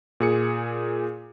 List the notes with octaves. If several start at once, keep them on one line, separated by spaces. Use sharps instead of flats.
A#2 G#4 C#7